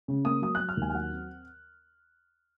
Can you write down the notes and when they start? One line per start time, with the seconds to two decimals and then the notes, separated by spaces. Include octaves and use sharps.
0.08 C#3
0.25 A#3 D#6
0.42 F#3 D#6
0.55 F#3 F#6
0.69 F6
0.77 D#2 G#5
0.90 G#5
0.94 F#3 F#5
1.12 C4